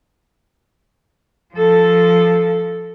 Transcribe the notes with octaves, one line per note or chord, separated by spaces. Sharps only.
F3 A4